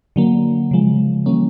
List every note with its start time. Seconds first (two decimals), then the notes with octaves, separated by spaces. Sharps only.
0.16 D3 F#3 A#3
0.71 C#3 F3 G#3
1.26 E3 G3 A#3 C#4